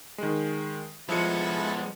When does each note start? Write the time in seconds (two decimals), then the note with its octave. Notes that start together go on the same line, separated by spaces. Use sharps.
0.18 D#3 G#3
1.09 F3 G#3 B3 E4 A4 C#7